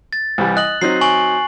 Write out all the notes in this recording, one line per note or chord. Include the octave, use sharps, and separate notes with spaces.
A6
C2 E3 G3
D#5 F#6 F#7
F#3 C4 D#4 C7
G#5 C#6 F#7